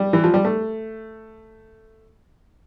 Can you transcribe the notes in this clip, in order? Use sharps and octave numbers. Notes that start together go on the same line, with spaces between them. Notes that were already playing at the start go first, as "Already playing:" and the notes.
Already playing: G3
E3
F3
G3
A3